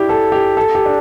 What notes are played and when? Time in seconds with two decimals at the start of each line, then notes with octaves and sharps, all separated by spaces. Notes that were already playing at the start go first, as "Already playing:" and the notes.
Already playing: D4 E4 G4
0.09 A4
0.32 G4
0.57 A4
0.75 G4
0.85 D4